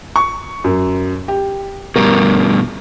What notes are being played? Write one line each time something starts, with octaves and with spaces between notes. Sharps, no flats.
C#6
F#2
G4
G2 B2 A#4